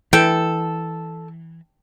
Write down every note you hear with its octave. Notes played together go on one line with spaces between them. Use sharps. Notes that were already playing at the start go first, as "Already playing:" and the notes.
E3 A4 G5